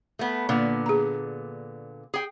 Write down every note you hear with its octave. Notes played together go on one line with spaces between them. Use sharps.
A3 B3
A#2 D3 A#3 B3
G#4 A#5
G#4 G5